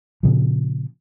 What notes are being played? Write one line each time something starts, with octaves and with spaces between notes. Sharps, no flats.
A#2 C#3 F3